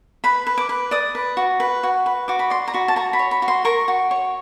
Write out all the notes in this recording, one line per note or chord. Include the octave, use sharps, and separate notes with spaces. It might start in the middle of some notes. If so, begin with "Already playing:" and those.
B4 B5
B4
D6
B4
D5 D#6
B4
F#4
B4
F#4
B4
F#4 D6
B5
D5 C6
A#5
F#4 B5
A5
F#4 A#5
B5
C#5
B5
F#4
C6
A#4 C#6
F#4
C#5